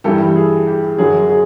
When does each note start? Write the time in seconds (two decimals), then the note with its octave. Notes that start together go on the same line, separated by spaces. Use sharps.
0.04 G2 E3 G3 G4 A4
0.25 G4
0.36 G#4
0.67 G4
0.98 F#2 D3 F#3 G#4
1.29 G#4